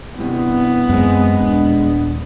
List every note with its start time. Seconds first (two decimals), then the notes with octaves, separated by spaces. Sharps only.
0.19 G2 C3 B3 E4
0.90 F#2 G#3 C4 G#4
1.41 D#1 D4